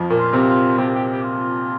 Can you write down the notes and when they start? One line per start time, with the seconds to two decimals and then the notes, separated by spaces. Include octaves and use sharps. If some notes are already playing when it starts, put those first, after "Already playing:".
Already playing: F2 F3
0.10 A#2 A#3
0.18 F4
0.33 C3 C4
0.48 F4
0.78 C3 C4 G4
0.95 G4
1.11 G4
1.23 F4